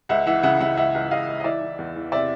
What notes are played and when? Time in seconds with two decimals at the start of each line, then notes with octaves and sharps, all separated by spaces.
0.09 C#2 E5 F#5
0.26 E3 E5 F#5
0.43 C#3 E5 F#5
0.60 C#3 E5 F#5
0.77 C#2 E5 F#5
0.94 C#2
1.11 C#2 D#5 F5
1.28 C#2
1.40 D#5
1.44 E3 D5 E5
1.61 E3
1.78 E2
1.96 E3
2.12 C3 D5 E5